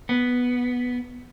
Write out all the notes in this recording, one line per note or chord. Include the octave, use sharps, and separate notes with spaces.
B3